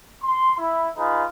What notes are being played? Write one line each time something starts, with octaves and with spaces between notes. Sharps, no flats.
C6
E4
D#4 F4 G#4 B4